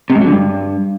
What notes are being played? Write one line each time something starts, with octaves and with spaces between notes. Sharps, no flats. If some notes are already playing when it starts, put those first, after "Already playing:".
C3
G#2
F#3
D3
G2